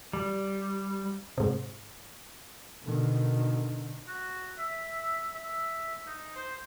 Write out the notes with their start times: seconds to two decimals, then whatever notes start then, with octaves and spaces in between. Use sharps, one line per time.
0.13 G3
1.38 G#2 C3
2.83 B2 D3 D#3
4.08 F#4
4.59 E5
5.35 E5
6.07 D#4
6.36 C5